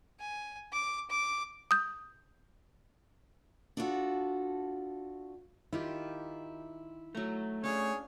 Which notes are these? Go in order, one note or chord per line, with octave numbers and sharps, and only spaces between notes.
G#5
D6
D6
D#6 G6
D4 F4 F#4 A4
D#3 E4 F4 G4
F#3 A3 A#5
C#4 D4 G#4 C#5 F5